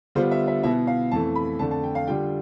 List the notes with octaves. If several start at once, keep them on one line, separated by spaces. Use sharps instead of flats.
D3 G3 B3 D4 F4 C5
E5
E5
B2 B3 E4 E5
F5
F2 E3 A3 A5
B5
F2 D3 A3 A5
A5
G5
F5
D3 G3 D4 F4 G5